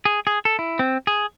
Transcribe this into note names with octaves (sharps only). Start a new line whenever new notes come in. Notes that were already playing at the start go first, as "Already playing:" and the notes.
G#4
G#4
A4
E4
C4
G#4